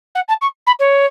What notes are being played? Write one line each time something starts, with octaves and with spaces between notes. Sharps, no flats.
F#5
A5
C#6
B5
C#5